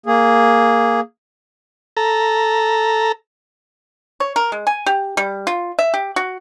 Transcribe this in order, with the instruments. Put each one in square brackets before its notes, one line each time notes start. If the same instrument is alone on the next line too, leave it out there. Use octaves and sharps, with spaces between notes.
[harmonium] A#3 G#4
[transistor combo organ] A4 A#5
[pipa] C#5
A#4
G#3
G#5
G4
G3
F4
E5
G4
F#4